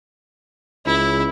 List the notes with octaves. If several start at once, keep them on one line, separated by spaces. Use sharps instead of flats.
C#2 E4